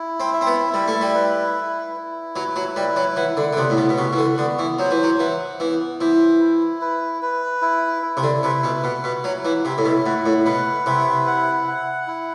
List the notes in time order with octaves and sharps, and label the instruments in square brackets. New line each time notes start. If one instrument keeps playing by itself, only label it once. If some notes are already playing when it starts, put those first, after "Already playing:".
Already playing: [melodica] E4
[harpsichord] C4
[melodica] E5
[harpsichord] C4
B3
[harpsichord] G3 [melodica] E4
[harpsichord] A3
G3
[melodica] B4
E4
E4
[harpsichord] F#3 [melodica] B4
[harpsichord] F#3
[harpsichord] G3 [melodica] E4
[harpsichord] F#3
[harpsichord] E3 [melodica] F#5
[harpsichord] D3
D3
[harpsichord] C3 [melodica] B3
[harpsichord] A2
B2
B2
[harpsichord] C3 [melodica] F#4
[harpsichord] E3
D3
[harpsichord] D3 [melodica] B3
[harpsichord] E3
[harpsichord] F#3 [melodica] C5
[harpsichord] E3
F#3
[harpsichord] E3 [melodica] F#5
[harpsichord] E3 [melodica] B3
[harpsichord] E3 [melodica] C5
[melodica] E4
B4
B4
E4
E4
[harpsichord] C3
D3
[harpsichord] C3 [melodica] B4
[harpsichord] B2
[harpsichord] B2 [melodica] F#5
[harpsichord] B2
[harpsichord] F#3 [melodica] E4
[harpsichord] E3
[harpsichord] C3 [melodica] E4
[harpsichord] A2
B2
[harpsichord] A2 [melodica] F#5
[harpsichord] A2
[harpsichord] B2 [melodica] B4
[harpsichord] C3 [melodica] E4
[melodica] F#5
F#5
E4